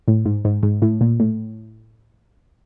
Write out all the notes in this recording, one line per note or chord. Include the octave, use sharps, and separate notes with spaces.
A2
G#2
G#2
G#2
A2
A#2
A2